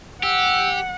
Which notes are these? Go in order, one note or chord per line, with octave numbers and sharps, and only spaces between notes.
G4 F#5 E6